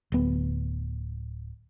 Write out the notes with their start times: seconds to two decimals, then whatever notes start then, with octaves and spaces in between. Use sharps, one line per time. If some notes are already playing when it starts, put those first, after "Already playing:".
0.12 D1 B3